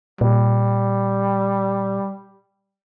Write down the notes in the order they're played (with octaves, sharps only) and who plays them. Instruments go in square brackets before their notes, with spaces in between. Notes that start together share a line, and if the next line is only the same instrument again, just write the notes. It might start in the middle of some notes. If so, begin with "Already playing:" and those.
[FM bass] A#2 [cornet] G3